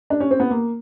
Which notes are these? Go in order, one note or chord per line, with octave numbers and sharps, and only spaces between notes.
D4
C#4
C4
B3
A#3